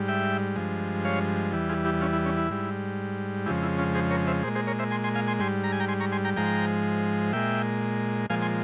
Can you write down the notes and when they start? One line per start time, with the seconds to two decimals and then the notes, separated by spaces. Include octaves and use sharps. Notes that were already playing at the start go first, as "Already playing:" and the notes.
Already playing: G#2 G3
0.08 E5 G5
0.56 G2 F3 G#3
1.05 C#5 F5
1.53 E2 E3 G3
1.69 F4 G#4
1.85 E4 G4
2.01 C#4 F4
2.13 E4
2.26 C#4
2.38 E4
2.50 G#2 G3
3.46 F2 C#3 F3 G#3 E4 G4
3.63 E4
3.78 C#4 F4
3.95 G#4 C5
4.11 A#4 C#5
4.27 C5 E5
4.43 A#2 G#4 C5
4.47 G#3
4.55 G#4 C5
4.67 A#4 C#5
4.79 C5 E5
4.91 G#5 C6
5.04 G#5 C6
5.15 F5 G#5
5.28 G#5 C6
5.39 G#2 G3 G#5 C6
5.64 A#5
5.72 G#5
5.80 G5 A#5
5.88 G#5 C6
6.00 A#5 C#6
6.12 G#5 C6
6.24 G5 A#5
6.36 G#2 F3 G#3 G5 A#5
7.33 A#2 G#3 E5 G5
8.30 A#2 F3 G#3 F5 G#5
8.42 G#5 C6